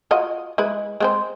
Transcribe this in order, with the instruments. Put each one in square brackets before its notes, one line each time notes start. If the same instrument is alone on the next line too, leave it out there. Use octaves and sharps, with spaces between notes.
[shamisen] F4 F#4 D#5
G#3 E4 B4
G#3 C4 C5